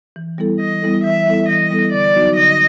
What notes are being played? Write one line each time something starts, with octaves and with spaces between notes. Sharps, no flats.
E3
G3 B3 E4 A4
E3 D#5
G3 B3 E4 A4
E3 E5
G3 B3 E4 A4
E3 D#5
G3 B3 E4 A4
D3 D5
F#3 B3 D#4 F#4
D3 D#5